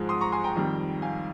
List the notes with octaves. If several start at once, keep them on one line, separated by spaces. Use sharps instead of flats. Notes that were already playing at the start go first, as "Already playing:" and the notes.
Already playing: G#2 F3 G#3
C6 D#6
A#5 C#6
G#5 C6
G5 A#5
F2 D#3 G3
F5 G#5